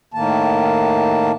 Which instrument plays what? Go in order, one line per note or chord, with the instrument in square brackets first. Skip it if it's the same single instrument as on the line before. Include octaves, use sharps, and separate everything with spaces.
[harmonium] A2 D#3 A#3 A5